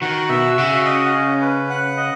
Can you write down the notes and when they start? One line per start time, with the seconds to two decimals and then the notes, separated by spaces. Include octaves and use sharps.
0.01 D#3 F#4
0.29 B2 E5
0.57 C#3 F#4
0.86 D#5
1.13 C#4
1.42 B4
1.70 F#5
1.97 D#5